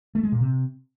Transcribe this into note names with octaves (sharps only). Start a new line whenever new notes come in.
A3
G#3
A#2
C3